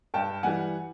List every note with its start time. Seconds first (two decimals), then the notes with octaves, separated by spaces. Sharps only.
0.14 G2 G5 A5
0.43 E3 G3 F#5 G#5